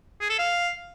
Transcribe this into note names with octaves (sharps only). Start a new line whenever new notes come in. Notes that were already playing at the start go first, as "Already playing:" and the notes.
G#4
A4
F5